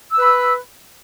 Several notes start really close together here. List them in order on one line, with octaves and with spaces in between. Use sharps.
E6 B4 B5